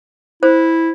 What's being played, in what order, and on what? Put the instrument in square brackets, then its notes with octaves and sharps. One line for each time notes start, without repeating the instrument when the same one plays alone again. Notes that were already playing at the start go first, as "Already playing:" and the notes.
[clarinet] E4 [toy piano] C5